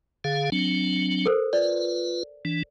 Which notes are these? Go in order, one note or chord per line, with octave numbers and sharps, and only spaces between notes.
D3 G#4 F5
F#3 C4 D4
A4 A#4 C5
F4 B4 D5
E3 D4